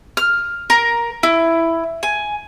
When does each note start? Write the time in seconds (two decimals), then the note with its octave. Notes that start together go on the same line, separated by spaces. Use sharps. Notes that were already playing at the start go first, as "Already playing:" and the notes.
0.17 F6
0.70 A#4
1.23 E4
2.03 G#5